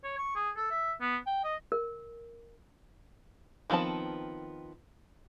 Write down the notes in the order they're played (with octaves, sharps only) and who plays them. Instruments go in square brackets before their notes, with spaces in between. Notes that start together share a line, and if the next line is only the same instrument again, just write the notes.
[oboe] C#5
C#6
G#4
A4
E5
B3
G5
D#5
[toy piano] A#4
[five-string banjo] D#3 F3 B3 C4 A5